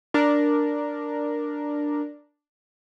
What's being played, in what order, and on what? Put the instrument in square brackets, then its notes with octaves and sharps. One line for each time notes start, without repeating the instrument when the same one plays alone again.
[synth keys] D4 A#4